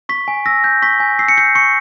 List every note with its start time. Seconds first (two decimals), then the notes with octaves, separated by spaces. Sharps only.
0.09 C#6 B6
0.28 G#5
0.46 E6 A#6
0.64 G6
0.82 C#6 B6
1.00 G#5
1.19 E6 C7
1.28 C#7
1.37 G6 C7
1.55 C#6 C#7